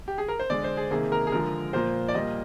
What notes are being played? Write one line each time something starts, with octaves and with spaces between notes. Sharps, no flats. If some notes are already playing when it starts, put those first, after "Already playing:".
G4
G#4
A#4
C5
D3 G#3 D5
C5
G#4
C3 D#3 A#3 G#4
A#4
G#4
D3 F3 G#3 A#4
A#2 F3 A#3 C5
D5
A#2 G3 A#3 D#5